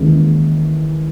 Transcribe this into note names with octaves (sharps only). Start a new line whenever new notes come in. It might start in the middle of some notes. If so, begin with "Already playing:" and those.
Already playing: D#2 C#3 E3 G#3 C#4